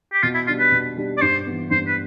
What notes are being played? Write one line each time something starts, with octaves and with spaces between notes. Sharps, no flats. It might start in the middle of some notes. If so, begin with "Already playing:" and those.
G4
B2 F4
E4
G3 D4 F4
B4
B2
G3 D4
D5
G2 C5
E3 B3
G2 C5
B4